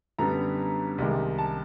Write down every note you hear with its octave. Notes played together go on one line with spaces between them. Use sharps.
F#2 D3 G3 B3 A#5
C2 C3 D#3 G#3
A5